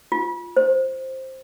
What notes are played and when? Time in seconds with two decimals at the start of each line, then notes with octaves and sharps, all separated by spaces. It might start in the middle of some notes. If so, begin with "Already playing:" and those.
0.12 F4
0.57 C5